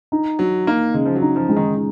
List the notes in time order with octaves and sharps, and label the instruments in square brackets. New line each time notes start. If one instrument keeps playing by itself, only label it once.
[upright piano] D#4
[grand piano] F#3 [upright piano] D#4
[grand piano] A#3 [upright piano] D#4
[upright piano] C#3 [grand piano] G#3
[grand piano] F3
F#3
[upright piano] D#4
[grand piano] F3
[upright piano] G#3
[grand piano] D#3